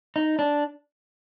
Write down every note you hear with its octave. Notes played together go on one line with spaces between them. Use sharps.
D#4
D4